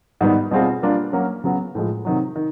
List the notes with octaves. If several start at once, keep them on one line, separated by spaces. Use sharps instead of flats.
G#2 D#3 G3 B3 D#4
B2 G3 C4 F4 G#4
G3 A#3 D4 F4
F#3 A#3 C#4
C#3 F#3 B3
A2 F3 G#3
C3 D#3 F#3
D#3